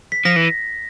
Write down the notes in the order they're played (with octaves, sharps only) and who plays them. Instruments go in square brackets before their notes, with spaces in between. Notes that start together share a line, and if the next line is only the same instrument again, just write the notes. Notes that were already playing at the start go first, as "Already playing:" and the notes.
[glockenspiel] B6
[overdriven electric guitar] F3 [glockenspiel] A#6
[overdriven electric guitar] E3